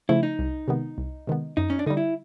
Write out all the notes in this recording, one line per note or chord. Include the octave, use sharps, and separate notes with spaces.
C#3 F3 A3 E4
D#4
C2
C3 D#3 G#3 B3
C2
C3 D#3 G#3 B3
F#2 D#4
C#4
D4
D3 G3 D#4
E4